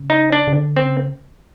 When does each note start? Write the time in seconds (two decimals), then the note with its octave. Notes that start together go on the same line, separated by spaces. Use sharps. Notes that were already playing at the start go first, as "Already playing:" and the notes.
Already playing: C#3
0.10 D#4
0.32 D4
0.47 C#3
0.53 D3
0.76 C4
0.83 C#3